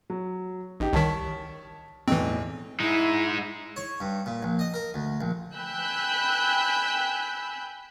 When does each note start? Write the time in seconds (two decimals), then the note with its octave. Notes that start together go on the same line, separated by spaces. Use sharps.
0.10 F#3
0.80 A1 D#4 G4
0.93 C2 D#3 C#5 A5 B6
2.08 B1 E2 A2 E3 C4
2.80 G#3 D#4 E4
3.76 C#5
4.00 G2
4.26 A#2
4.43 A#1
4.59 D#5
4.74 A#4
4.94 D2
5.21 A#1
5.55 G5 G#5 B5 E6 F#6 G6